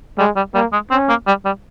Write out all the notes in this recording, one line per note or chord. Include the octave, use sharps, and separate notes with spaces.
G3 G#3
G3
G3 A#3
G#3
C4 C#4
A#3
G3
G3